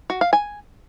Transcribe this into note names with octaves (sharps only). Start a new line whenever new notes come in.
F#4
F5
G#5